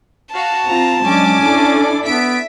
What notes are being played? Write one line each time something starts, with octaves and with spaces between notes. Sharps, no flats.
F#4 F5 A5
C4 F4 A#5
F#3 G#3 C#4 D4 G#5 D6
D4 E4 A4
B3 E5 B6 D7